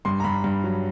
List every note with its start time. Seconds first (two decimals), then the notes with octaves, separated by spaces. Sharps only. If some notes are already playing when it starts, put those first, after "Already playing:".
0.05 G2 C6
0.20 A#5
0.24 G2 B5
0.44 G2
0.64 F#3